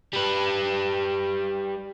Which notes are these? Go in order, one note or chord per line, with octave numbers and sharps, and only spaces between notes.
G3 B4